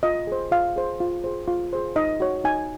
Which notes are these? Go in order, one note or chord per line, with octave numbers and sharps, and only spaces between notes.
F4 D#5
G#4 C5
F4 F5
G#4 C5
F4
G#4 C5
F4
G#4 C5
D#4 D#5
F#4 C#5
D#4 G#5